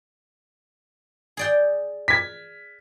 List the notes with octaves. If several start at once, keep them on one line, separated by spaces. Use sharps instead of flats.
G#4 D5 G5
G#6 B6